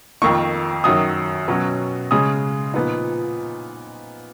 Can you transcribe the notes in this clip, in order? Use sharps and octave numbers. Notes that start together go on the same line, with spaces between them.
F2 D#3 A#3 D#4 C#6
F#2 D#3 F#3 D#6
B2 F#3 C#4
C#3 G#3 C#4 D#6
A#2 F3 B3 D#4